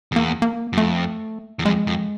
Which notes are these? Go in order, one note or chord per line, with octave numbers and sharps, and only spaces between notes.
E2 A#3
A#3
F#2
F2 A3
E2
F2 G#3
F2